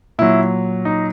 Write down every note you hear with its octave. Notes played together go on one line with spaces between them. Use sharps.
A#2 F#3 E4
D#4